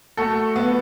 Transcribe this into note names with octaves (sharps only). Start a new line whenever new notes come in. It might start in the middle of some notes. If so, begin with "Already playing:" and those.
A3 F#4 A4
B3